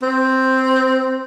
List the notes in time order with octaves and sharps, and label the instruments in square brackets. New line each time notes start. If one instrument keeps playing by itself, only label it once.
[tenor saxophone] C4